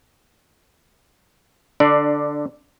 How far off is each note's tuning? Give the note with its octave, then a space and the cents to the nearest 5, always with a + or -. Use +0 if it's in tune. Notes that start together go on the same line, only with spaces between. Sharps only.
D3 +0 D4 +20 D5 +0